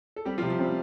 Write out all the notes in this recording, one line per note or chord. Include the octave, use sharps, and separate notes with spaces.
A4
G3 C4 G4
F3 F4
C3
F3
G3 C4